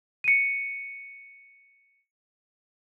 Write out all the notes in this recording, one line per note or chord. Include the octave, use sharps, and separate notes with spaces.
C#7 D#7